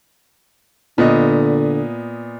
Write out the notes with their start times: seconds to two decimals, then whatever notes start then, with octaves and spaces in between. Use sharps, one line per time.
0.98 A#2 D3 B3 D#5